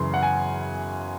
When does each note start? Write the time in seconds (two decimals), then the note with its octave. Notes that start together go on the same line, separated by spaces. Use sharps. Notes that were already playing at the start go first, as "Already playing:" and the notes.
Already playing: F#2 C#3 E3 C6
0.14 F#5
0.23 G#5